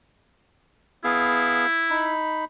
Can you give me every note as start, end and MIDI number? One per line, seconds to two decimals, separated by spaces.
1.04 1.66 59
1.04 2.16 64
1.04 1.66 68
1.04 1.66 77
1.90 2.45 63
1.90 2.45 83